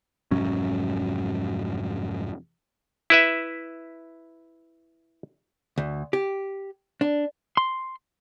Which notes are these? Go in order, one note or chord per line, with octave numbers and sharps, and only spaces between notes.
F1 G#2 F#3 C#4
E4 B4 E5
D2
G4
D4
C6